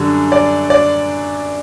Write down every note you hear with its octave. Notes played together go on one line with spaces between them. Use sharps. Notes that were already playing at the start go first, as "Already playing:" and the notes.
Already playing: F#2 D3 G3
D5
D5